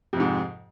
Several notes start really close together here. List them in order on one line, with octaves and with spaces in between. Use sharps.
F2 C3 G#2